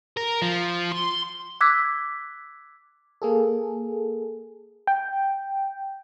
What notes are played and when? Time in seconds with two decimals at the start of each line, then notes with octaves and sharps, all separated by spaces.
0.17 A#4
0.42 F3
0.92 C6
1.61 D6 E6 F#6 G#6 B6
3.22 A#3 G#4 A4
4.87 G5